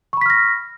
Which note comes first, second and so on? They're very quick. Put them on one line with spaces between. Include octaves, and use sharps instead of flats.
C#6 B5 B6 F6 A#6